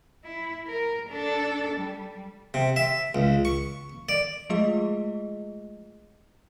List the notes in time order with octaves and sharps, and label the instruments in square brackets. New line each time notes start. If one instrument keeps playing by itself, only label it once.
[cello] E4
A#4
D4 A4
G3
[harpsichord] C3
E5
C#2
C#6
D5
[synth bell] F3 G#3 A3 F4 G#4 D#5